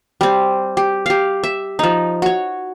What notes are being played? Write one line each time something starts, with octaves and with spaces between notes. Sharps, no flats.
G3 C4
G4
G4 F5
E5
F3 D#4
F#4 C#5